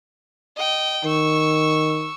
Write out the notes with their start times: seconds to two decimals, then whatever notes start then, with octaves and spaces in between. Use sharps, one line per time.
0.56 D#5 G5
1.04 D#3 C#6 E6